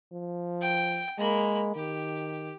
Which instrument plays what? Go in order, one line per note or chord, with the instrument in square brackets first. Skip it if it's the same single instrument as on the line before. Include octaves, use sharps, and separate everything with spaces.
[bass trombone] F3
[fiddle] G5
[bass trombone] G#3 [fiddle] A#3 B5
[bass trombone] D#3 [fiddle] G4